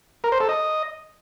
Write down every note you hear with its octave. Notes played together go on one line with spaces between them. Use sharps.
A#4
C5
A4
D#5